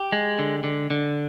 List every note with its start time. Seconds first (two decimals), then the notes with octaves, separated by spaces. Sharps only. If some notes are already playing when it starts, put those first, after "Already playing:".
Already playing: G4
0.12 G#3
0.39 D3
0.64 D3
0.90 D3